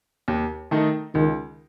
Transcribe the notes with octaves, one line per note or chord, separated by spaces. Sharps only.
D#2
D#3 A3 D#4 A4
C#2 D#3